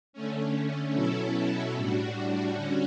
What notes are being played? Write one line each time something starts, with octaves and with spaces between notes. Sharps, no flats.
D3 A3 C#4
B2 F#3 C#4 E4 A4
A2 G3 D4 F#4
D3 G3 C#4 F#4